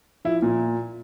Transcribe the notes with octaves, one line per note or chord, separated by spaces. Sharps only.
F3 E4
A#2